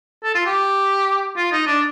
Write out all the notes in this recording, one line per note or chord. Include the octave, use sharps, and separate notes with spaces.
A4
F4
G4
F4
D#4
D4